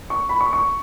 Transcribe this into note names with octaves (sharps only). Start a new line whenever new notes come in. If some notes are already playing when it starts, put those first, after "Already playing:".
C#6
B5
C#6
C#6